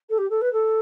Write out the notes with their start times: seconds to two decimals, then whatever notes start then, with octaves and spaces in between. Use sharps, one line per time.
0.10 A4
0.18 G4
0.30 A4
0.41 B4
0.53 A4